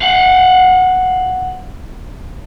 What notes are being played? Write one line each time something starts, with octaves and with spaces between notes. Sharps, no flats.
F5 F#5